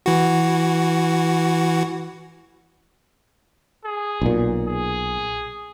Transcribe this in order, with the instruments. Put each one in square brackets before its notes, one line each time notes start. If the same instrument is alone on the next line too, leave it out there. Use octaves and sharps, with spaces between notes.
[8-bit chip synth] E3 F#4
[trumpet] G#4
[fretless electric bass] B1 A#2
[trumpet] G#4